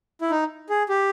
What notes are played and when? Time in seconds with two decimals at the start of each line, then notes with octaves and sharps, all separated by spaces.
0.21 E4
0.31 D#4
0.69 G#4
0.89 G4